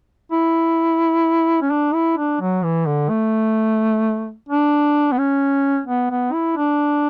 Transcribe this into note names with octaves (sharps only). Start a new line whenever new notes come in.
E4
C#4
D4
E4
D4
F#3
E3
D3
A3
D4
B3
C#4
B3
B3
E4
D4